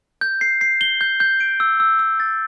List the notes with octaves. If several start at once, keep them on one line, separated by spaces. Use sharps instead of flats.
G6
C7
C7
G7
G6
G6
D7
E6
E6
E6
A6